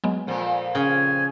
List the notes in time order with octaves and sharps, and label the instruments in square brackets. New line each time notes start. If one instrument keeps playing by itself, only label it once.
[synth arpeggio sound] F#3 G#3 B3
[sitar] F2 A#2 C4
[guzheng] C#3 [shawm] G#5